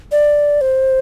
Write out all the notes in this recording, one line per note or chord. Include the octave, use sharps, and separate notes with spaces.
D5
C5